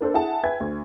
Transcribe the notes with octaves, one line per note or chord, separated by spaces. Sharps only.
A#3 D4 A4 C5
E4 G#4 F#5 A5
B4 E5 G5 G#5 G#6
D2